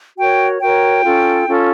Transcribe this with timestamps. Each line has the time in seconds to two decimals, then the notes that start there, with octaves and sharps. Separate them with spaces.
0.18 F#4 A#4 C#5 G5
0.60 F#4 A#4 C#5 G5
1.03 C#4 F4 A4
1.46 C#4 F4 A4